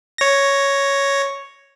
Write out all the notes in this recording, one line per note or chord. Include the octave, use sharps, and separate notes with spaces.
C#5 A#6